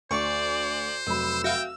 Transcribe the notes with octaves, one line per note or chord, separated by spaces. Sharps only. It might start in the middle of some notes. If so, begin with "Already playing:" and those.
D2 C5 D5 C#6
F1 F#3 B5 E6
F#4 E5 F5 G5